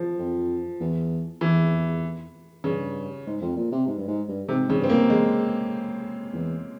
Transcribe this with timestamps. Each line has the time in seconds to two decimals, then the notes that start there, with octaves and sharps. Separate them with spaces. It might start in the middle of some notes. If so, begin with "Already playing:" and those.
Already playing: F3
0.19 F2
0.80 E2
1.41 E2 E3
2.64 G2 C#3
3.27 G#2
3.41 F2
3.57 A#2
3.72 C3
3.87 G#2
3.98 G2
4.08 G#2
4.28 G2
4.49 G#2 C3
4.68 G#2 C#3
4.80 G2 C4
4.90 A#3
5.10 G#3
6.33 E2